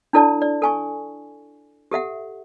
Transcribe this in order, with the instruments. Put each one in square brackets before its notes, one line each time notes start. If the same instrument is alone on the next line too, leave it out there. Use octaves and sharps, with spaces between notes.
[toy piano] D4 E4 A4 D5 A5
D5
A4 G#5 C#6
G4 A4 E5 F#5